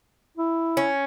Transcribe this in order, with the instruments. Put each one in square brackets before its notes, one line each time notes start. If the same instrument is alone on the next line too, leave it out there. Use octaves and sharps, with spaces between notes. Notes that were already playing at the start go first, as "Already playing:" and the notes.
[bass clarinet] E4
[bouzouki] C#4